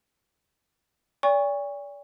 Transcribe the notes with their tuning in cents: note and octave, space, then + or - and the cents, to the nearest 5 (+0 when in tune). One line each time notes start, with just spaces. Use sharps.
D5 -35 G#5 -45 C#6 +0